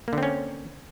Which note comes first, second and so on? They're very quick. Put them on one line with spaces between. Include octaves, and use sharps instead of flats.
A#3 D3 C4 C#4